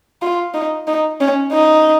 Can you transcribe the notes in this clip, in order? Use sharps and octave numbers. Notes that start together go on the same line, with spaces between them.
F4
D#4
D#4
C#4
D#4